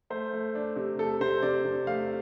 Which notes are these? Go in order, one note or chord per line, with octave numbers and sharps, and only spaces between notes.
A3 C5
A3
D4
C3
A3 A4
C3 C5
C3 D5
C3
A3 F5